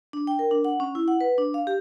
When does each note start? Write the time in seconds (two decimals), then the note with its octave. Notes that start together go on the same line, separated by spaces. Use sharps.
0.13 D4
0.27 G5
0.39 A#4
0.51 D4
0.64 F#5
0.80 C#4
0.95 E4
1.08 F#5
1.21 B4
1.38 D4
1.54 F5
1.67 G4